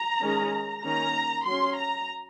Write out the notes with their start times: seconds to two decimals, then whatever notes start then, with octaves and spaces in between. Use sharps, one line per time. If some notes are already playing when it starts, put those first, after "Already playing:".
Already playing: A#5
0.21 D#3 G#3 C#4
0.83 D#3 A#3 C#4 A#5
1.45 F#3 C#4 C6
1.77 A#5